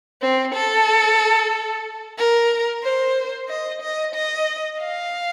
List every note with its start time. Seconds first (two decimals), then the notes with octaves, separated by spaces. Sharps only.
0.21 C4
0.54 A4
2.17 A#4
2.83 C5
3.48 D#5
3.81 D#5
4.14 D#5
4.79 F5